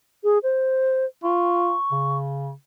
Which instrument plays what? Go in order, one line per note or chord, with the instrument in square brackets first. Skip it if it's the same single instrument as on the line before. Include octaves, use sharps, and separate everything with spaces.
[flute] G#4
C5
[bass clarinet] F4 [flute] C#6
[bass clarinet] C#3